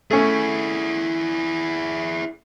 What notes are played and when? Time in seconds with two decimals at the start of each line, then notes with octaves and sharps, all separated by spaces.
0.11 A3 C#4 E4 G#4